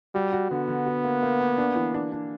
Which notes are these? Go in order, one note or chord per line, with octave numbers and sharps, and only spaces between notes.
G3 F#4
F#4
D3 B3
D3
F#4
A#3
A#3
A#3
D4
E3
D4
D4